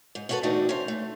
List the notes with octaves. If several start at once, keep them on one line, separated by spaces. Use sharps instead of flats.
G#2
C#4 D#4 F#4 G#4 A4 B4
E2 A3 C4 D4 D#4 F#4
C#4 C5
A3